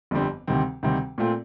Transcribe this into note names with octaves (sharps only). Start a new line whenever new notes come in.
G1 F2 D3 G3 C4
D2 C3 D#3 G3 C4
D2 C3 D#3 G3 C4
A#2 A3 C4 F4